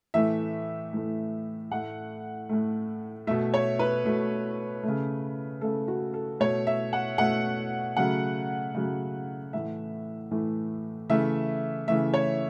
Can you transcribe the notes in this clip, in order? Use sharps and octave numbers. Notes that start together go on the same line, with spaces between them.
A2 E3 A3 E5
A2 E3 A3
A2 A3 F#5
A2 A3
B2 A3 E5
C#5
B4
B2 A3
C#3 A3
C#3 A3 A4
F#4
A4
B2 A3 C#5
E5
F#5
B2 A3 F#5
C#3 F#3 A3 F#5
C#3 F#3 A3
A2 E3 A3 E5
A2 E3 A3
C#3 E3 A3 E5
C#3 E3 A3 E5
C#5